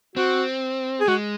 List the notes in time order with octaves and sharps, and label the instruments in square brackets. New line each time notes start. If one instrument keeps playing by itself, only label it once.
[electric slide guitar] C4 [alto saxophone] F#4
[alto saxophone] G#4
[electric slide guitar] G#3 [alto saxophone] F#4